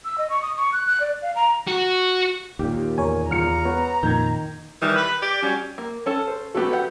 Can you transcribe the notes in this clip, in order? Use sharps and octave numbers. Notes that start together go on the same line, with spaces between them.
E6
D#5
C#6
D#6
C#6
F#6
F#6
D5
F5
A#5
F#4
D#2 A#2 G4
E2 A#4 C#5 G#5
E2 F4 A#5 F6 C#7
B3 C#5
F2 A#2 D#3 G6 G#6
D#3 E3 G3
B4
G4 D5
F#3 G3 C#4
A#3
C#4 A4 A5
C5
F#3 A3 B3 G4 A4
G4 F#5